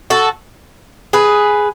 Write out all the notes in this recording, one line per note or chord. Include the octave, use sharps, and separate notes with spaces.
F#4 A4
G#4 B4